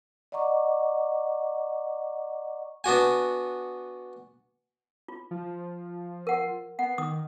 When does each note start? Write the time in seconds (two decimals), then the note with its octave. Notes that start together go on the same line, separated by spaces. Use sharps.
0.32 D5 D#5 F#5 A#5 C#6 D6
2.84 B3 D4 F#4 G#5
5.08 F4
5.31 F3
6.27 A#4 F#5
6.79 B3 F#5
6.98 D#3 D#6